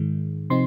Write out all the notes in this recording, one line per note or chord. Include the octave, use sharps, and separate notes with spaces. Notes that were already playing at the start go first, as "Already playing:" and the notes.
Already playing: G#2 D#3 G#3
C3 F3 C4 D#4 C6